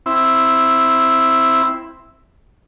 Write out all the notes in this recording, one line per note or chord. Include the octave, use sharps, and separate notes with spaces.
C4 E4